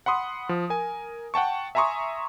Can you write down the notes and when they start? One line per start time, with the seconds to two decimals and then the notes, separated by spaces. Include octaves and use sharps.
0.06 F#5 B5 C6 D#6
0.49 F3
0.70 A#4 G#5
1.34 F#5 G5 A5 C#6
1.75 E5 G#5 A#5 C6 C#6 D#6